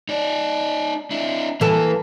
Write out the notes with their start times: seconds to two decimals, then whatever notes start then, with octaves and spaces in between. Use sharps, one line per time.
0.09 D#4 D5
1.11 D4 E4
1.61 E3 A#3 A4